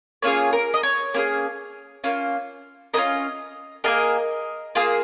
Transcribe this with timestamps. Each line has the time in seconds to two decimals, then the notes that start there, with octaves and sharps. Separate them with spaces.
0.22 A#3 C#4 F4 G#4 C#5
0.53 A#4
0.74 D#5
0.83 C#5
1.14 A#3 C#4 F4 G#4
2.04 A#3 C#4 F4
2.94 A#3 C#4 F4 A#4 D#5
3.84 A#3 F4 G#4 A#4 D#5
4.75 A#3 F4 G#4